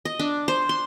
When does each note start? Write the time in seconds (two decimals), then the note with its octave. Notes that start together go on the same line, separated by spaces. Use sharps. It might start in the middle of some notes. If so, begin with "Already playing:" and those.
0.05 D#5
0.19 D4
0.48 C5
0.69 C6